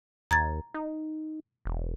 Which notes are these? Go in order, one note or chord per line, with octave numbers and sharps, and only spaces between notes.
D#2 A#5 G#6 A6
D#4
E1